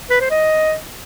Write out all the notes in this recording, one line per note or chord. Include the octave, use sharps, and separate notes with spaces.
B4
C5
D#5